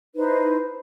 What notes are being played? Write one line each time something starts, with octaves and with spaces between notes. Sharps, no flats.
D#4 E4 B4 C5